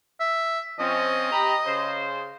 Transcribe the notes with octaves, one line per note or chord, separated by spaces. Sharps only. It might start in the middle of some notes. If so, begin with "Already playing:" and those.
E5
F3 C4 C#4 D#5
G4 A#5 B5
C#3 C5